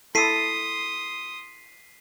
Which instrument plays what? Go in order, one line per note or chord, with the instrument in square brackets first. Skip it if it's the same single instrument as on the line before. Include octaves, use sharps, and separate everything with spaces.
[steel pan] E4 A4 [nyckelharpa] C6 D#6 [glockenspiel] B6 C7 D#7